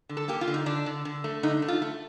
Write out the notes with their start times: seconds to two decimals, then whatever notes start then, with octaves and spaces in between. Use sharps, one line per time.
0.09 D3
0.17 A4
0.28 A#3 G4
0.41 F4
0.48 D3
0.54 D#4
0.66 D3 D4
0.86 D3
1.05 D3
1.24 A3
1.43 D3 D#4
1.62 A3
1.68 F4
1.82 A3